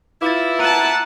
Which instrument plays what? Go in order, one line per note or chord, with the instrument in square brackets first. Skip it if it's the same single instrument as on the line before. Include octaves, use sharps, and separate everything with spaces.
[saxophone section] E4 [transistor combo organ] F4 B4 F5 [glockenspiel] D6 A6
[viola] F#5 A5 [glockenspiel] A#5 D#7